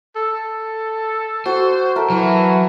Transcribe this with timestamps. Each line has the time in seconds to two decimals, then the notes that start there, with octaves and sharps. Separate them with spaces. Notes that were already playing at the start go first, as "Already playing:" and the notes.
0.16 A4
1.46 F#4 C5
1.96 A4 A#4 E5
2.10 E3 F#3